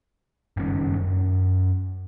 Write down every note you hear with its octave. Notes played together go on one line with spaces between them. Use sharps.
F#1 G2 D#3 C#4
F#2